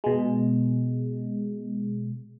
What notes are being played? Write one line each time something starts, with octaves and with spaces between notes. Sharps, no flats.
B2 G#3